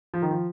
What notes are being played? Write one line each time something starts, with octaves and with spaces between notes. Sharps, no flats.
F3
D#3
F3